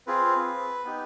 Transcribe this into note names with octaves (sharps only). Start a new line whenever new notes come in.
C4 F4 G#4 B4
B3 D#4 G4